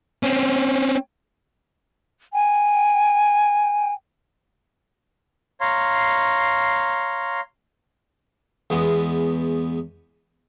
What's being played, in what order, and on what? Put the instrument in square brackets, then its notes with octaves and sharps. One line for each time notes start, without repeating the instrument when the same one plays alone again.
[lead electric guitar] C4 C#4
[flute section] G5 G#5
[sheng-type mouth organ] C#5 F5 A#5 C6
[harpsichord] E2 G#3 B3